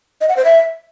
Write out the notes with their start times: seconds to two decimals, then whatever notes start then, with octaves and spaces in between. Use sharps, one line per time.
0.21 D#5
0.29 F#5
0.37 C5
0.45 E5